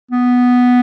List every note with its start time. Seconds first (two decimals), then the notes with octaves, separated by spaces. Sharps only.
0.11 B3